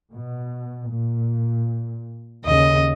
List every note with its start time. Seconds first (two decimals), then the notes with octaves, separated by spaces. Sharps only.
0.12 B2
0.87 A#2
2.45 D#2 C#3 D#5